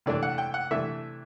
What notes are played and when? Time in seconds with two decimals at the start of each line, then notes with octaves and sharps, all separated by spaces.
0.06 C3 E3 A3 D4 D5
0.23 F#5
0.38 G5
0.54 F#5
0.71 C3 E3 A3 D4 E5